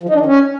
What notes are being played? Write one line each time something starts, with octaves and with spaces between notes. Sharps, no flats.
F3
D#4
D4
D#3
C#4